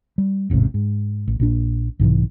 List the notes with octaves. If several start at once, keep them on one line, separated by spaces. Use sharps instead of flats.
G3
E1 A1 G#2 C3
G#2
A1
A#1 A#2 D4
B1 G#2 C3 E3